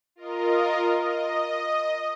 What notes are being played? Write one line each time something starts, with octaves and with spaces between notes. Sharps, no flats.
F4 A#4 D#5
D#5